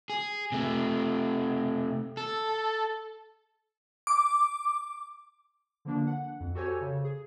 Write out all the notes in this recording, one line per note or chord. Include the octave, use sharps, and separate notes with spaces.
G#4
C3 A3
A4
D6
D3 F3 A#3 D4
F#5
F2
F#4 G4 A4 C5 C#5 G#5
C#3
G#4